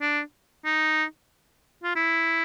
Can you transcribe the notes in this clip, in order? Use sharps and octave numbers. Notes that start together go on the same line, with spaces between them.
D4
D#4
F4
E4